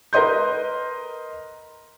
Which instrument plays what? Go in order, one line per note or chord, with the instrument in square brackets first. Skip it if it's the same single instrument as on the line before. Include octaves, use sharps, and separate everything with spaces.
[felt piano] A#4 B4 D#5 C6 G6